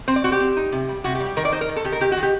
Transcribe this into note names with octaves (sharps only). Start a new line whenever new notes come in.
C4 C5
D5
C4 F#4
G4
C4
D#4
C3
G3
C3 F#4
G4
G3
G4
D#3 A#4
D5
D#4 C5
A#4
D#3
A4
D#3 G4
A#4
D#3 G4
F#4
D#3
G4